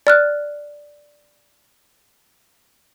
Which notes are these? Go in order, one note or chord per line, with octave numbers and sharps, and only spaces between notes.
D5 F6 F#6